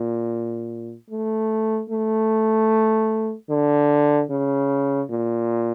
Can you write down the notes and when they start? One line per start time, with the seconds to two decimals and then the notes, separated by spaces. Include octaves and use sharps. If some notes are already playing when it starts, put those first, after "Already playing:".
Already playing: A#2
1.10 A3
1.90 A3
3.50 D3
4.30 C#3
5.10 A#2